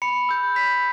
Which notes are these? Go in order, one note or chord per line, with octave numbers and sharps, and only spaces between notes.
B5 C#7
E6 G6
B5 B6